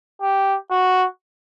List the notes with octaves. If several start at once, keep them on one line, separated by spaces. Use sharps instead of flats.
G4
F#4